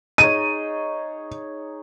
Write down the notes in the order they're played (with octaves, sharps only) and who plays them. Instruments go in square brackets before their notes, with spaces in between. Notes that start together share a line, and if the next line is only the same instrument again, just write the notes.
[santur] D#4 G#4 C#5 [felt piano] D#7